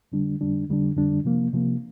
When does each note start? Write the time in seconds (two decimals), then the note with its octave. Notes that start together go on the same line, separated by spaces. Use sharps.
0.12 F2 D3 G3 D4
0.41 F2 D3 G3 D4
0.69 F2 D3 G3 D4
0.97 F2 D3 G3 D4
1.24 C3 F3 A#3
1.53 C3 F3 A#3